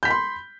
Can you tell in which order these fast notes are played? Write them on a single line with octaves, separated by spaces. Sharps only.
G6 B6 B5 C6